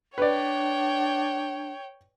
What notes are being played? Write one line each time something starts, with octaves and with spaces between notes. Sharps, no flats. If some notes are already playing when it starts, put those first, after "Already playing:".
D4 B4 C#5 D5 G5